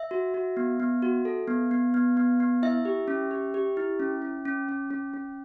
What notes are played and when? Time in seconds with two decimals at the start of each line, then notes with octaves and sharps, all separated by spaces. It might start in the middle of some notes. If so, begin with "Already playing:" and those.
Already playing: E5
0.11 F#4
0.34 F#4
0.57 B3
0.80 B3
1.02 F#4
1.25 A4
1.48 B3
1.71 B3
1.94 B3
2.17 B3
2.40 B3
2.63 E4 E5
2.85 G4
3.08 C#4
3.31 G4
3.54 G4
3.77 E4
4.00 C#4
4.22 C#4
4.45 C#4
4.69 C#4
4.91 C#4
5.14 C#4